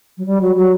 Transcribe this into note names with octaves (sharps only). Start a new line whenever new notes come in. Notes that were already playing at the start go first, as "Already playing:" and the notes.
F#3
G3
F#3
F#3